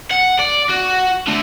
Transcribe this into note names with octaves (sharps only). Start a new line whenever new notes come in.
F#5
D5
F#4
D3 A3